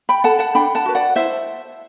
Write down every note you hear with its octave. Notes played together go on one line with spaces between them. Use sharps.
G5 B5
A4 F#5 A5
F#5 A5
D4 G5 B5
F#5 A5
F#4 B4
D5 F#5
E4 C5 E5